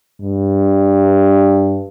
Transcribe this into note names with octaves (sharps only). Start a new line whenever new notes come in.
G2